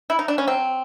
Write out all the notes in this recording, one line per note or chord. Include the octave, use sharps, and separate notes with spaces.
E4
D#4
D4
C#4
F#3 C4